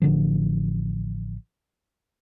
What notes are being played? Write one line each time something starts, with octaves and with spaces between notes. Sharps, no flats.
A1 D3 F3